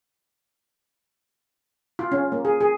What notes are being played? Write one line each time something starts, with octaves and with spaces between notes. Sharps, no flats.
F4
C#4
A#3
G#4
G#4